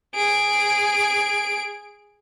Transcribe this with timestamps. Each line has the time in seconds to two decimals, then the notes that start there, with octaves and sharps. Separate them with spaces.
0.14 G#4 D7